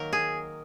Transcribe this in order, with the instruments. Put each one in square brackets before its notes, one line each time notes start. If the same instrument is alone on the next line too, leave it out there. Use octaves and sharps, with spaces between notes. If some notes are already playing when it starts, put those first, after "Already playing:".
Already playing: [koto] D#3 F#3 A#3 A#4
G#4